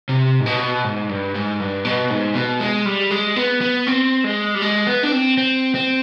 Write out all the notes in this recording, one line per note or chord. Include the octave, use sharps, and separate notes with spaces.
C3
G#2
B2
G#2
G2
G#2
G2
B2
G#2
B2
G#3
G3
G#3
B3
B3
C4
G#3
G3
G#3
B3
D4
C4
C4
C4